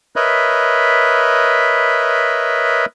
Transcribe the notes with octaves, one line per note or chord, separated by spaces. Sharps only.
A#4 B4 C#5 D#5 E5 B5